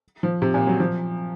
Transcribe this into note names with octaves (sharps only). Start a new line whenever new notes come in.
F3
C3
A#2
F#3
F3